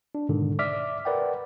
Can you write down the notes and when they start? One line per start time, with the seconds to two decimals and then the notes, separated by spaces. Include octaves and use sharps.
0.15 D4
0.29 G#2 B2 D3 D#3
0.59 D5 E5 D6 F6 B6
1.05 A#4 B4 D5 F#5 G5